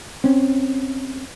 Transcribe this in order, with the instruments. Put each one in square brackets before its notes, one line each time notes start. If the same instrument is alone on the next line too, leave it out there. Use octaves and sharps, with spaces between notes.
[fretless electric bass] C4 C#4